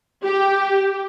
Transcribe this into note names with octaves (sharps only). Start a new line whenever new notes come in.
G4